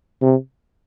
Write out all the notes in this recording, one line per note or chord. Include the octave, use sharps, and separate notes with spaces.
C3